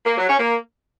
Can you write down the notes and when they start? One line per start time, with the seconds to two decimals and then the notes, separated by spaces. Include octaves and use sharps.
0.06 A#3
0.17 F#3
0.28 C#4
0.39 A#3